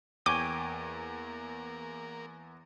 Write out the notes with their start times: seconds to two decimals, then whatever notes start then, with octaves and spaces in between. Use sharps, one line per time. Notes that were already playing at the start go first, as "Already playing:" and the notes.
0.26 E2 A#3 C#5 G5 G#5 D6